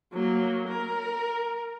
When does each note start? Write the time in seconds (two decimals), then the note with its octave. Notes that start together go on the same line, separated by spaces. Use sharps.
0.13 F#3 A#3
0.68 A#4